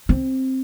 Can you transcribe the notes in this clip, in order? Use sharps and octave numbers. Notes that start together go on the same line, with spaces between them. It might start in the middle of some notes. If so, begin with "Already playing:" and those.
C4